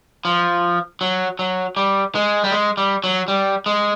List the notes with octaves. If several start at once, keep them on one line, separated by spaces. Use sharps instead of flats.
F3
F#3
F#3
G3
G#3
G3
G#3
G3
F#3
G3
G#3